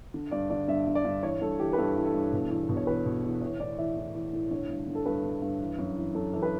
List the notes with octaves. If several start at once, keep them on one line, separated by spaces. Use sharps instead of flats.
D3
G2 D5
D3 D5
G2 E5
D3
D5
G2
E3 C#5
G2 A4
E3 G4
B4
G2 A4
E3
A4
G2
B2
E2
B2
C#5
E2 B4
B2
E2
E3 C#5
A2 D5
E3 E5
A2
E3
A2
D3 C#5
G2
D3
A4
G2 B4
D3
G2
E3
F#2
E3
F#2 A4
E3 A4
B4